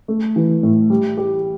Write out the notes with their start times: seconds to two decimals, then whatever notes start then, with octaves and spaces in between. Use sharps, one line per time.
0.08 A3
0.36 E3
0.63 A2
0.90 G3
1.17 G4